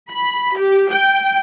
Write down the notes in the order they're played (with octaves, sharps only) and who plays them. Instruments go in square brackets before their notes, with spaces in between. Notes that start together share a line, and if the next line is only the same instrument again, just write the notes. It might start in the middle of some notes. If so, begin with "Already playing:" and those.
[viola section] B5
G4
G5